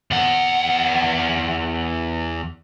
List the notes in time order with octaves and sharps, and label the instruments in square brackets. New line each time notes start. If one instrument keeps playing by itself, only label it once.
[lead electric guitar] E2 F#5